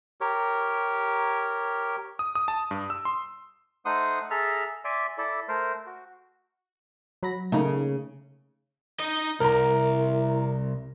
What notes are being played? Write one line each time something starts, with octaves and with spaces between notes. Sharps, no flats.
G4 A#4 C#5
D#6
D#6
A5
G2
E6
C6
A3 D#4 C5 F#5 C6 D#6
G#4 A4 E5 A5 A#5 F6
D5 E5 G#5 C6 D6
E4 A4 D5
A3 A#4 C5
F#4
F#3 B5 A#6
C#3 A3 A#3 D#4
D#4 D#5
C2 E4 A#4 A#5